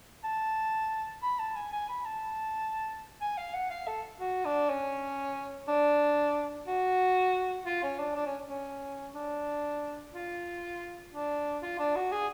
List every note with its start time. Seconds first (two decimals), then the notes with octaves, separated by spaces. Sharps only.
0.24 A5
1.23 B5
1.39 A5
1.56 G#5
1.73 G#5
1.89 B5
2.06 A5
3.21 G#5
3.37 F5
3.54 F#5
3.70 F5
3.87 A4
4.20 F#4
4.45 D4
4.70 C#4
5.68 D4
6.67 F#4
7.66 F4
7.83 C#4
7.99 D4
8.16 D4
8.26 C#4
8.47 C#4
9.15 D4
10.14 F4
11.13 D4
11.63 F4
11.79 D4
11.96 F#4
12.12 G#4